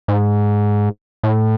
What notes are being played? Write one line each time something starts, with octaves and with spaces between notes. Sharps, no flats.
G#2
A2